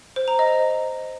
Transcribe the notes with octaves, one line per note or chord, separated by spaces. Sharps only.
C5
A#5
D#5